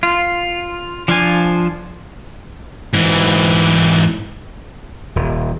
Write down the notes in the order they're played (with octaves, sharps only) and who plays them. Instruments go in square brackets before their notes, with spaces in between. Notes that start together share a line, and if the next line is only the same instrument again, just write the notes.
[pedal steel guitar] F4
F3 D4 F4 C5 G#5
[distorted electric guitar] G#2 E3
[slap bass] D#1